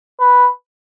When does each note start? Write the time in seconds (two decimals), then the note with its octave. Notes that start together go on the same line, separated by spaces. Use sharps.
0.20 B4